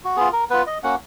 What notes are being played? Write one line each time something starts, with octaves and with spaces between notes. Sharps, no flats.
F#4
B3 F4 G#4
A#4
B3 F4 B4
D#5
A#3 C#4 F#4 F#5